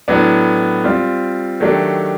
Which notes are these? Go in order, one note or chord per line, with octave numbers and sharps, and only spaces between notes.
A2 F#3 B3 D4
G3 C4 F4
D#3 F#3 A3 D4 G4